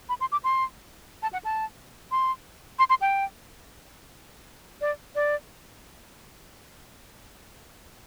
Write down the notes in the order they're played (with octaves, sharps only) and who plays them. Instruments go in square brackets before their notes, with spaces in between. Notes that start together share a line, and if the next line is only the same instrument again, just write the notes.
[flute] B5
C6
D6
C6
A5
F#5
A5
C6
C6
C6
G5
D5
D5